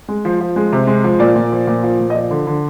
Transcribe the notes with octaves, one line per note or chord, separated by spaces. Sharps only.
G#3
F3 C5
F3
G#3
C3
G#3
F3
A#2 D5
A#2
F3
A#2
F3
A#2
D#5
F3 D5
D3
D3